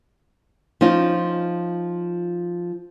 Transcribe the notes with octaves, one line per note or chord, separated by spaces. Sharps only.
F3 C#4 D#4 F4